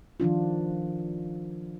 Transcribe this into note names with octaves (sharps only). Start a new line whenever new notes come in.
D#3 F3 D4 F4